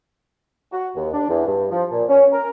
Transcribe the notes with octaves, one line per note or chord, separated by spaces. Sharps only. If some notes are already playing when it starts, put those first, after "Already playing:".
F#4
D#2
D4
E2
G2
F3
A#2
C#4
A#4